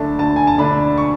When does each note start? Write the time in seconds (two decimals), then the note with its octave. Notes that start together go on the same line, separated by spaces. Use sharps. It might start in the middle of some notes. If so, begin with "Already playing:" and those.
Already playing: D2 D3 A3 D4 A5
0.19 D2 A5
0.36 G#5
0.47 A5
0.58 D3 A3 D4 B5
0.98 C#6